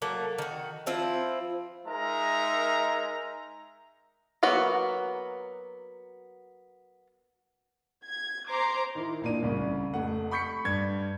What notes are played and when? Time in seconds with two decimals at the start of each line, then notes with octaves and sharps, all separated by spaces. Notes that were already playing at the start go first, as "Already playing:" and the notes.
0.02 F#3 A3 A#3
0.38 D#3 F#4
0.86 F3 C4 E4 F4
1.86 G#3 D#4 A#4 E5 A#5
4.43 F#3 A#3 B3 F#4
8.04 G#6
8.47 C5 A#5 C6 D6
8.95 D#3 E4
9.21 A#1 A#2 A#3 D4 D#7
9.42 C2 C#3
9.94 F1 A3 F#5
10.31 B5 C#6 G6 B6 C#7
10.65 G2 G#6